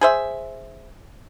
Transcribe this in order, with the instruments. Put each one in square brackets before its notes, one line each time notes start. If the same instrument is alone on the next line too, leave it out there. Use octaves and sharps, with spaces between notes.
[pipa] G#4 C5 E5